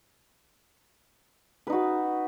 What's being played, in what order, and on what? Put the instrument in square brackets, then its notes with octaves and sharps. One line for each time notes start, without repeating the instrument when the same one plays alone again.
[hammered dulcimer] B4
D#4
F#4